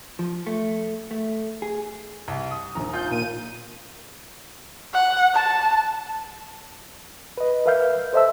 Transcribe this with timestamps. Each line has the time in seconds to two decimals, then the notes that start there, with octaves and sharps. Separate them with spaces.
0.19 F3
0.47 A3
1.11 A3
1.62 G#4
2.28 C2
2.51 D#6
2.75 A#1 D#2 A#5
2.93 F4 G6
3.10 A#2 D#7
4.94 F#5
5.35 A5
7.38 B4 D#5
7.66 A#4 B4 E5 F5 F6 G6
8.13 A4 C5 D#5 E5 A5 E6